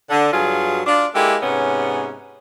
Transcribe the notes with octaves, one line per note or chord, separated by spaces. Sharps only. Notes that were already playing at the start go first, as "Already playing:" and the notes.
D3
G2 F#3 F4 G#4
D4 F4
G#3 A#3 E4 G4 A4
G#2 C3 B3 C#4